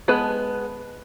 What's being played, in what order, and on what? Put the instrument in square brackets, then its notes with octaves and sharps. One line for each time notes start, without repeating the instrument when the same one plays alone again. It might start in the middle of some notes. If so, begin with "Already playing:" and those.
[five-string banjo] G#3 B3 G#4 B4 A5